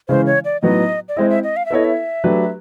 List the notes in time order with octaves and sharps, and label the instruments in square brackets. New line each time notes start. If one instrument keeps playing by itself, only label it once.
[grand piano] C#3 E3 G#3 [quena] C5
[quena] C#5
D5
[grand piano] A2 F#3 B3 D#4 [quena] D#5
[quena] D5
[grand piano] G#3 C4 E4 [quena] D#5
[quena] E5
D#5
F5
E5
[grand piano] B3 E4 A4 C#5 [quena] D#5
[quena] E5
[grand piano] F#3 A3 D4 G4 B4